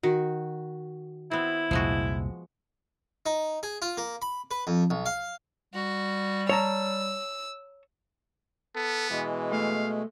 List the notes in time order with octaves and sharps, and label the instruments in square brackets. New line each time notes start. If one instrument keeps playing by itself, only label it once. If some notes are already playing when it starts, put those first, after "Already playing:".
[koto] D#3 [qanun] F#4
[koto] B3 C4 [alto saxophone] E4
[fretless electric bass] C2 F2 A#2 [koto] F3 G#3 F#4
[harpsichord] D#4
G#4
F4
A#3
B5
B4
F2
B1
F5
[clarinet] G3 [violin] F#4
[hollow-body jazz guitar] C#5 A5 A#5 [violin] E6
[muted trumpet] B3 [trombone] A4
[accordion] B2 G#3 [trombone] E3
[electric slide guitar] A3 [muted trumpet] F5